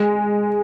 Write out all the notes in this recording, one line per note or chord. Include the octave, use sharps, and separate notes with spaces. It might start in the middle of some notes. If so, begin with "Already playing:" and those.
Already playing: G#3